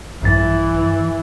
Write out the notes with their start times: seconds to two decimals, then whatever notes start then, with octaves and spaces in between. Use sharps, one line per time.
0.22 A#1 G2 E3 A6